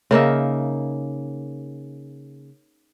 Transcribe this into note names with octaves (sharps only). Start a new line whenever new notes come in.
C#3 A#3 D#4 E5